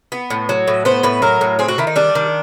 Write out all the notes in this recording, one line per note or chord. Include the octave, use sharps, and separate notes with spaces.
B3
A2
F#3
A2
B3 C5
A2 B4
F#3 A#4
A2
C4 G#4
F#4
D#3 E4
D#4
G3 D4
D#3